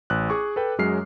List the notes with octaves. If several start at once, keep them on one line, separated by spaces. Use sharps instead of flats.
A1 F#6
G#4 C#6 D6
A4 B4 G5
F#2 F#3 G#3 F6 C7